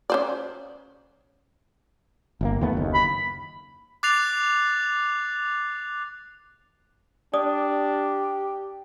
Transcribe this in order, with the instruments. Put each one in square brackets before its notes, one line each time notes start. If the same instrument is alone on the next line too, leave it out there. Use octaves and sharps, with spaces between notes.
[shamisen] C#4 C5 D5
[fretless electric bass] G1 C3 A#3
D#2 A3 B3
F#1 D#2
[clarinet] B5
[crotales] D6 F#6 A6 C7 F7
[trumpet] D4 [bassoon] G4 [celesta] D5 D#6